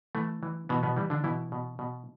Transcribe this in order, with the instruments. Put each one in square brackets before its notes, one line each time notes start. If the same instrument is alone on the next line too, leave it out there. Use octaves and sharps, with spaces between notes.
[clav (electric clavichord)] E3 A3
E3
B2 E3 B3
B2 B3
E3 G3
D3 D4
B2 E3 E4
B2
B2